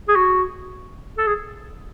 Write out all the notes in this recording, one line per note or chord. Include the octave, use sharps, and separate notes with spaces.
G#4
F#4
A4
G#4